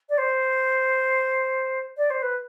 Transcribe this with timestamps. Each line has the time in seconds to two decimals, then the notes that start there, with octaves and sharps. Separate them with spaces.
0.09 D5
0.18 C5
1.97 D5
2.10 C5
2.22 B4